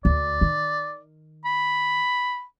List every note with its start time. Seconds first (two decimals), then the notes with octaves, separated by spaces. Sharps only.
0.05 D2 D5
0.41 D#3
1.45 B5